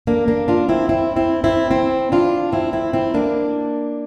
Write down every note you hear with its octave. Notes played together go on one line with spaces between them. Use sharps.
A#3 D4
A#3 D4
D4 F4
C4 E4
C4 E4
C4 E4
C4 E4
C4 E4
D4 F4
C4 E4
C4 E4
C4 E4
A#3 D4